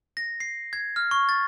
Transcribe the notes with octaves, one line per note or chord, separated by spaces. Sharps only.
A#6
C7
G#6
F6
C#6
A6